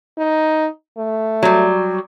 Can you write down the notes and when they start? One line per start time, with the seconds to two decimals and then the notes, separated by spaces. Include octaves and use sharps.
0.18 D#4
0.98 A3
1.43 F#3 G3